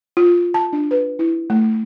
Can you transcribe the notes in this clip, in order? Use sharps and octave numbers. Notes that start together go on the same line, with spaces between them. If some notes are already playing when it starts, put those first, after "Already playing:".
F4
A5
D4
B4
E4
A3